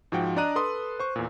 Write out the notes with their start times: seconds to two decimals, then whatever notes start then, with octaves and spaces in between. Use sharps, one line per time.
0.12 G#2 F3 F#4 G5
0.36 D4 D5 D#5 A#5 F#6 D#7
0.56 A4 B4 C6 D#6
0.99 C5 C#6
1.16 E2 A#2